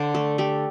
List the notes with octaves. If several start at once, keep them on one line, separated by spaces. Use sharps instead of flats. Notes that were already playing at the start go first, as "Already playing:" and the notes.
Already playing: D3 C5 D5
A3 A4
A3 G4